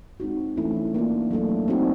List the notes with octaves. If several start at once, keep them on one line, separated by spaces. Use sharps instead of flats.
G#3 C4 D#4 F#4
E3 A3 C#4 E4
A#3 D4 F4
F#3 A3 D4
C4 D#4 F#4